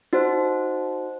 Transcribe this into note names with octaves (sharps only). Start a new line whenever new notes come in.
D#4 F#4 C5